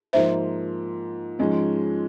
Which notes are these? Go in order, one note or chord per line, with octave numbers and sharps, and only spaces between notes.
G#2 F3 A#3 C5 E5
G#2 F3 G#3 C#4